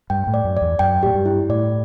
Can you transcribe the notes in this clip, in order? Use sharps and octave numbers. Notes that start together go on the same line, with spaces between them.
G2 G5
A2
D5
F#2
E2 D5
F#2 G5
A2 G4
G2
E4
A2 D5